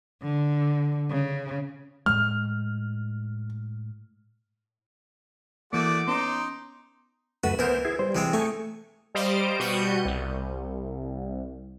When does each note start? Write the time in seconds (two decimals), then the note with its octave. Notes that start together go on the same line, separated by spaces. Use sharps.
0.23 D3
1.10 C#3
2.06 A2 G#3 F6
5.73 E3 A3 A#3 F#4 D5 D6
6.07 B3 C#4 D#4 C6
7.44 C#2 F#2 A3 F#4 B4
7.59 E3 B3 A#4 C5
7.85 E4 G#4
7.99 G3 C5
8.15 C3 E3 G#3 C4
8.33 A3 D#4 G#5 C#6
9.15 G3 C5 D#5 F5 D7
9.60 B2 G3 F#4 G6 C#7 D#7
10.05 C2